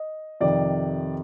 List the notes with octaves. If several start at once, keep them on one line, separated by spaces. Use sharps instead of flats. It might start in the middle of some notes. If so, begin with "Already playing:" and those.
Already playing: D#5
F2 C3 D#3 D5